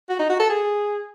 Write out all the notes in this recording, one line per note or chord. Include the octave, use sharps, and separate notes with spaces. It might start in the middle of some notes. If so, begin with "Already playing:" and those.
F#4
D#4
F#4
A4
G#4